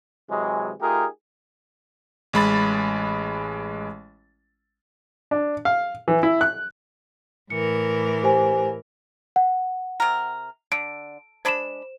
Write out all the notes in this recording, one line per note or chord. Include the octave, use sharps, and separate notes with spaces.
C3 E3 F#3 G#3
A3 D#4 F4 G4 G#4 A#4
A1 G#3 B5 A6
D4
F5
E3
E4
F#6
A2 E3 A#4 C#7
G4 C5 G#5
F#5
C3 A#4
D3 D7
G#3 D4 C5 B5 E7